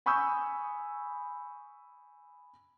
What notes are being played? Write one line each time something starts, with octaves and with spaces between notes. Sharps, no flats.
G#5 B5 C#6 D#6 E6 G6